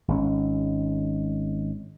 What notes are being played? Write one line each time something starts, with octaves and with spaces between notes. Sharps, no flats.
G#1 G#3 C#4